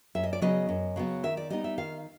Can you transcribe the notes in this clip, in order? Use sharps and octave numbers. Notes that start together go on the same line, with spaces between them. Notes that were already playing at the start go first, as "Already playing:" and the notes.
F#2 E5
D#5
D5
C#3 F#3 B3 D#5
F#2
C#3 F#3 B3
D#3 E5
D5
G3 B3 D#4 D#5
E5
D#3 F5